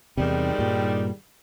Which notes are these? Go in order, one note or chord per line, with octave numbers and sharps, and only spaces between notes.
E2 G#2 C3 D#3 G3
G2 A#2